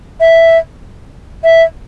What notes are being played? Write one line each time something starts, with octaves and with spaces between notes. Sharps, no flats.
E5
E5